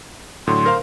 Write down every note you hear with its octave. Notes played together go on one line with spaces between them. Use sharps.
A2 D3 F#3 C6
A#4 C5 F5